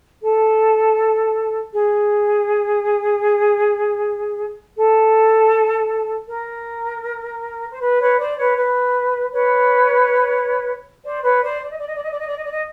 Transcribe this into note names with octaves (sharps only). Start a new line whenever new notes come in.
A4
G#4
A4
A#4
C5
B4
B4 C#5
C5 D5
B4 C#5
B4
B4 C#5
C5 D5
B4 C#5
C5 D5
D5
D#5
D5
D#5
D5
D#5
D5
D#5
D5
D#5
D5
D#5